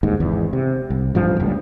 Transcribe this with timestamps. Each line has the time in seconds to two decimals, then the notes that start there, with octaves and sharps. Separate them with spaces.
0.03 G1 D#2 G#2
0.20 G#1 E2
0.53 C3
0.90 C2
1.15 A1 G2 F3
1.40 F#1 C#2 G2